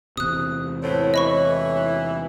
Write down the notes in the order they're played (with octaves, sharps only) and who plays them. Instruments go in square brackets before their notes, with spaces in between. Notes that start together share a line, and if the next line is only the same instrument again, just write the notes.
[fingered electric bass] E2 C3 [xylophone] D#6 F#6
[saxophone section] A2 B3 C4 [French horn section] E4 A4 C#5
[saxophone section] E3 [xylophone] D#5 B5 C#6